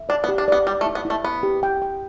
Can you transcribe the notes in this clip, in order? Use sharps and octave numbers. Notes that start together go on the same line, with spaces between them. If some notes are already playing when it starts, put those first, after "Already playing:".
Already playing: E5
D4 D5
B3
G4
D4
B3 D5
G3 D5
A3
E4
B3
E4
A3
B3 B5
G4
G5
G5